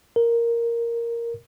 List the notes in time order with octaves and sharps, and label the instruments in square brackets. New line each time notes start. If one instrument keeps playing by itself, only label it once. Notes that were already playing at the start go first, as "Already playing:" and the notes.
[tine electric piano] A#4